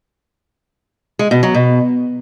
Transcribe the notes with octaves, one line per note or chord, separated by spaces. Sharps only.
G#3
B2
F#3
B2